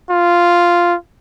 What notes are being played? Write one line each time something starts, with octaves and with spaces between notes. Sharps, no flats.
F4